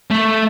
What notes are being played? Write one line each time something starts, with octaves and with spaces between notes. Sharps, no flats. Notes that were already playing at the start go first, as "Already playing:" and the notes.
A3